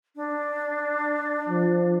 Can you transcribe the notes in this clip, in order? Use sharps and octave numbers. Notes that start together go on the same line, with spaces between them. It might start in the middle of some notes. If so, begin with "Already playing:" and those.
D4
F3